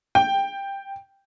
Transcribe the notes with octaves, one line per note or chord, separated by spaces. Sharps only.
G5